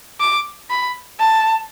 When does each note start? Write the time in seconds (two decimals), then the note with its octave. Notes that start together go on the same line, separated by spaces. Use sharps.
0.20 D6
0.70 B5
1.20 A5